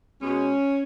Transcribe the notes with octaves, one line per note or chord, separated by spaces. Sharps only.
B2 G#3 C#4